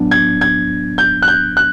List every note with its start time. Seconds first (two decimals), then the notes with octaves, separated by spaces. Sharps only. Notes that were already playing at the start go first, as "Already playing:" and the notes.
Already playing: A2 F#3 B3 D4
0.11 G#6
0.41 G#6
0.98 G6
1.22 F#6
1.28 G6
1.57 F#6